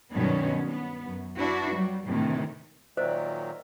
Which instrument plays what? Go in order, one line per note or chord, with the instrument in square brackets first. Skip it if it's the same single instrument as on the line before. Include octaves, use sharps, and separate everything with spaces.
[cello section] G2 B2 D#3 F#3 B3 C#4
B3
F#2
D4 E4 F#4 B4
F#3 G3
D2 A2 C3 D#3 E3
[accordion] A#2 D#3 F#3 [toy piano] C5 [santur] D5 E5